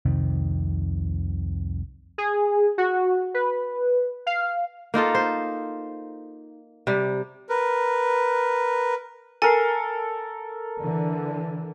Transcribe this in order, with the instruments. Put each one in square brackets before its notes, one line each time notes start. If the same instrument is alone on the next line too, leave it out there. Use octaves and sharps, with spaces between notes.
[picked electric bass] C2 F2 C3 D#3
[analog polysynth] G#4
F#4
B4
F5
[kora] A#3 D#4 F4 A4
C5
C3 G3
[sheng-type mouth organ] A#4 B4
[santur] A4 A#4 [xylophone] G#5 C7
[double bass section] D3 E3